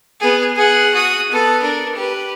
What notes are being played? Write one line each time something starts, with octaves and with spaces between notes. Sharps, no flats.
B3 G#4
G#4 F#5
F#4 D#6
B3 A4
D4 A#4
G4 B4